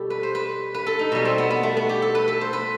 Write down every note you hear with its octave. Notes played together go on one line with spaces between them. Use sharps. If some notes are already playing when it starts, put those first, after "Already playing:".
Already playing: B2 G3 G4 A4
B4
C5
B4
B4
A4
D#4
B2 G3
C4
B3
B3
A3
B3
G4
A4
B4
A4
C5
B4